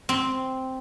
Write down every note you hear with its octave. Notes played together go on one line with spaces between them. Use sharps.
C4